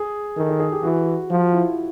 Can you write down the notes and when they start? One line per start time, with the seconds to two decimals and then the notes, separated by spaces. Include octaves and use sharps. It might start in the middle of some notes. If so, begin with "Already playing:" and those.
Already playing: G#4
0.37 D#3 A4
0.49 G#4
0.60 G#4
0.72 G4
0.83 E3 F#4
1.30 F3 F4
1.53 E4